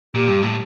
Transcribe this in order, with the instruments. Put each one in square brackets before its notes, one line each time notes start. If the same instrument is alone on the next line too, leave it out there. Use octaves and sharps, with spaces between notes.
[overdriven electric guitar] A#2 [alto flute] G4
[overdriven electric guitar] G2
A2